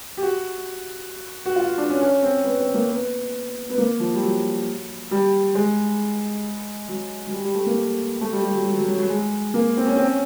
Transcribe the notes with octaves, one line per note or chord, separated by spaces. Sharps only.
G4
F#4
F#4
F4
D4
C#4
C#4
C4
B3
C4
A#3
B3
B3
A#3
F3
G3
F#3
G3
G#3
F#3
F#3
G3
G3
A3
A#3
A3
G3
G3
F#3
F#3
F#3
F#3
F#3
G#3
A#3
C4
C#4
C4
C#4